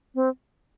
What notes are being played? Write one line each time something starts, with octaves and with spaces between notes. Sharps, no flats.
C4